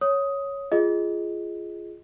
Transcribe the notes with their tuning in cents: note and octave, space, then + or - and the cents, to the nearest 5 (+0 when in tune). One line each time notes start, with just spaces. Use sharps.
C#5 +0 D#6 +10
F4 -15 G#4 +0 D#5 +5